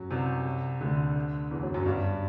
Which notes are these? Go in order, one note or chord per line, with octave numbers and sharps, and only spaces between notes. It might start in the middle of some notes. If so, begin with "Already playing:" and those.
Already playing: F#2 F#3
C2 C3
D2 D3
E2 E3
F#2 F#3
F#2 F#3
G2 G3